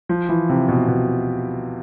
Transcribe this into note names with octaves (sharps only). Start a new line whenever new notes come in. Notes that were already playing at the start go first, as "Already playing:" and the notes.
F3
E3
C3
B2
B2